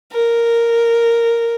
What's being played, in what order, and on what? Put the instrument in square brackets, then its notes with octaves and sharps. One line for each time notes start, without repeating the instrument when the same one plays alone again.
[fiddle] A#4